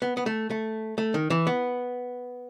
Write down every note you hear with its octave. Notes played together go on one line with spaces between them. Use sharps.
B3
B3
A3
A3
A3
D#3
E3
B3